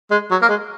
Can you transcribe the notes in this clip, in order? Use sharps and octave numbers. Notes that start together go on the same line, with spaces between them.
G#3
F#3
A#3
G#3